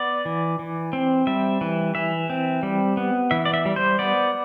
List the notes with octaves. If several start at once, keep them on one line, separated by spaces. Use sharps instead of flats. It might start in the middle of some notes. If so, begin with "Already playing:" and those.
Already playing: B3 D5
E3
E3
C4
G3 E5
E3
E3 E5
C4
G3
B3
E3 E5
D5
E5
G3
C5
B3 D5